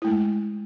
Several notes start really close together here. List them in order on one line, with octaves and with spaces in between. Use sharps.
E4 A3 G#3